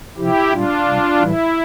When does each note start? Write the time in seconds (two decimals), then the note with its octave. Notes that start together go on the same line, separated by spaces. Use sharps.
0.17 C3 F3 E4 G4
0.51 A#2 G3 D4 F4
0.86 C3 G3
1.20 A2 E3 G3 E4